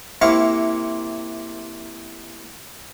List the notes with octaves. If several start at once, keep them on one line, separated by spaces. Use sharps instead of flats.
C3 A#3 E4 F5 C#6